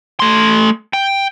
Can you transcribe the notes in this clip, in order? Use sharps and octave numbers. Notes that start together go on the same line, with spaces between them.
A3 C6
G5